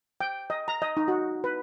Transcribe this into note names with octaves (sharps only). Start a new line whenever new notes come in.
G5
D#5
A#5
D#5
D#4
F#4
B4